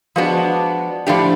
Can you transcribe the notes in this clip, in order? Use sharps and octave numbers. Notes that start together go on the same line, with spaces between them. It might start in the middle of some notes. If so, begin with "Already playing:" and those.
F3 G#3 B3 D4 F#4
A2 F3 A3 D4 G4